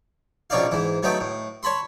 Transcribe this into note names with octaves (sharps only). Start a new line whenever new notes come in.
A#1 B2 C#4 D#4 D5 F5
G#2 E3
F#3 A3 B3 D#4 G5
A2
C#5 A5 B5 C6